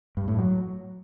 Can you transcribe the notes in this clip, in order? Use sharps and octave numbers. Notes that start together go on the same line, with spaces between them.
G2
A2
F#3